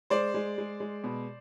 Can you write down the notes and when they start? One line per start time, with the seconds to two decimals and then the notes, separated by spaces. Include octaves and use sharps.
0.10 G#3 C5 D5
0.34 G#3
0.58 G#3
0.80 G#3
1.04 B2